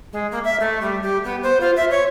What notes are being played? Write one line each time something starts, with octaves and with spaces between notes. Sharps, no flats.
G#3
A#3
E5
A3
G3
G4
B3
C5
F4
E5
C#5